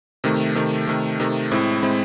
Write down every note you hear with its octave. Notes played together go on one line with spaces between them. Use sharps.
C3 D#3 A3
C3 D#3 A3
C3 D#3 A3
C3 D#3 A3
A2 G#3 C4 E4
A2 G#3 C4 E4